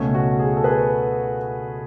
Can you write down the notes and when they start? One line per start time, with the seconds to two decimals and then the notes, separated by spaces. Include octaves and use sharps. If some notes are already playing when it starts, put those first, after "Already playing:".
Already playing: C#2 B2 A3 C#4
0.15 F#4
0.39 G#4
0.57 A4
0.64 G#4 B4